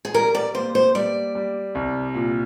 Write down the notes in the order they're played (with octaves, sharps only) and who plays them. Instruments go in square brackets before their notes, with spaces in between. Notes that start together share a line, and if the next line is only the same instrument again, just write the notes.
[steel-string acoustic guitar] G#4
[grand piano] G3 [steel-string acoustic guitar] A#4
[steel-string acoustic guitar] D5
[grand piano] A#3 [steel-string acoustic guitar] C5
[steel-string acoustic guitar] C5
[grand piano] G3 [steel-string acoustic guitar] D5
[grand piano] G3
C2
A#2